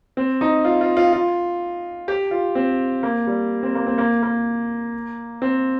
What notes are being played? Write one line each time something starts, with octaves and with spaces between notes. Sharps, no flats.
C4
D#4
F4
F4
F4
F4
G4
F4
C4
A#3
G3
C4
A#3
C4
A#3
A#3
C4